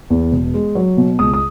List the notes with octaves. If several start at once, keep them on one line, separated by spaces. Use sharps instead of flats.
E2
E1
G#3
F#3
B2
C#2 D#6
D#6